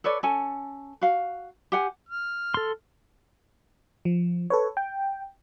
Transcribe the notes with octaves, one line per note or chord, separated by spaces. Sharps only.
A4 B4 C#5 D5
C#4 A4 G#5 A5
F#4 F5
G4 F#5 G#5
F6
A4 C6
F3
A4 B4 C#5
G5